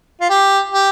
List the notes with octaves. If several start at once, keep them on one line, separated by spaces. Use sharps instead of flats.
F4
G4
G4